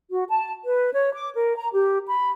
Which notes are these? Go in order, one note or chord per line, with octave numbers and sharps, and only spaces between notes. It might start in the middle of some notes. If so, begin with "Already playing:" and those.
F#4
A5
B4
C#5
D6
A#4
A#5
G4
B5